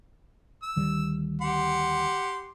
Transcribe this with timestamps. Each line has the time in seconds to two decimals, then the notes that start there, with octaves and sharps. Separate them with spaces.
0.63 E6
0.76 D2 D#3 G3
1.42 G4 F#5 C6